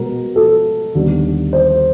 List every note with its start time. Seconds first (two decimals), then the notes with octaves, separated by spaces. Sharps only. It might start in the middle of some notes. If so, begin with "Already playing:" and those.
Already playing: B2 G#3 B3 A#4
0.36 A4
0.95 D#2 D3 G3 B3
1.53 C5